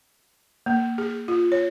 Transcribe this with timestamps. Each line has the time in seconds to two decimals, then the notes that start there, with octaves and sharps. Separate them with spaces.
0.66 A#3
0.98 G#4
1.28 F4
1.52 C#5